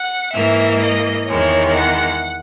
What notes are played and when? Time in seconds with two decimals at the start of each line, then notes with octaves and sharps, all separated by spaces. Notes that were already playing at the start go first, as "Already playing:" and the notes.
Already playing: F#5
0.33 G#2 E3 A#3 E5
0.80 D#5
1.27 E2 D#3 G#3 C#5
1.75 F#5